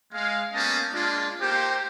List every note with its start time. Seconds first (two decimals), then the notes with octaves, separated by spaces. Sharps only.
0.12 G#3 F5
0.53 A#3 B3 C#4 G4 D#5 A5
0.92 G#3 A#3 D4 F4
1.41 A#3 D#4 G4 C5